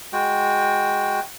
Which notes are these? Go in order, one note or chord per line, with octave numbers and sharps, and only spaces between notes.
G#3 F#4 G5